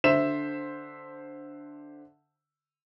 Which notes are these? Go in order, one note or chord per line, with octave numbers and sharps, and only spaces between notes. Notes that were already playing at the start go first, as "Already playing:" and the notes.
D3 C5 E5 E7